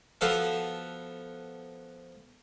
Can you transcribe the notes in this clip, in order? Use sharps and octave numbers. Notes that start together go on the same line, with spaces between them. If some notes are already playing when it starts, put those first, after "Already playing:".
F3 B3 F#4 A4 F5